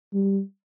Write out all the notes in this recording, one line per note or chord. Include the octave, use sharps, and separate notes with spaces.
G3